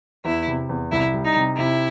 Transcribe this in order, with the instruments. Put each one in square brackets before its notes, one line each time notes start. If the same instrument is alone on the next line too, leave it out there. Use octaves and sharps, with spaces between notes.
[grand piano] E2 [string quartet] E4
[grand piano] C3
E2
[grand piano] C2 [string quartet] E4
[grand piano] G3
[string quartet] D#4
[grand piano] C3
[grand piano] C3 [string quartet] E4